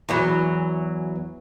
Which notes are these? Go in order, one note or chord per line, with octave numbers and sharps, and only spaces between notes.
E2 E3 F#3